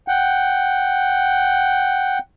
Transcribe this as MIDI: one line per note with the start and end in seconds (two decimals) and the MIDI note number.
0.08 2.19 78
0.08 2.19 79